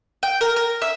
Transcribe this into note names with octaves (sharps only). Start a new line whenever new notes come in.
G5
A#4
A#4
E5